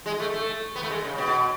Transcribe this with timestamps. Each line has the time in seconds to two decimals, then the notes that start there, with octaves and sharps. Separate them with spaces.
0.06 G#3
0.20 A3
0.34 A3
0.75 B3
0.83 A3
0.90 G#3
1.05 C#3
1.18 B2